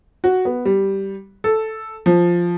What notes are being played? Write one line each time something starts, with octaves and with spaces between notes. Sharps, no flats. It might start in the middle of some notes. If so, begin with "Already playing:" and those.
F#4
B3
G3
A4
F3